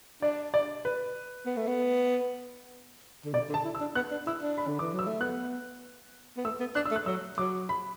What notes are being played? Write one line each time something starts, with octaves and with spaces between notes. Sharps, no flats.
D4 D5
D5
B4
B3
A3
B3
D3
B2 D5
D3
A5
E4
E6
D4
B3 F#6
D4
E4 E6
D4
B5
D3
E3 D6
F#3
E6
A3
B3 F#6
B3
A3 E6
B3
D4 F#6
E6
A3
F#6
F#3 E6
F#3 D6
B5